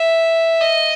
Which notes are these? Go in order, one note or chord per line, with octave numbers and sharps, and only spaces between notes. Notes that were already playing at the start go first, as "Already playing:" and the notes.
Already playing: E5
D#5